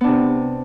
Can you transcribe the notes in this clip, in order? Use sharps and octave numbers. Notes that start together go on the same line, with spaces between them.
C3 B3 D4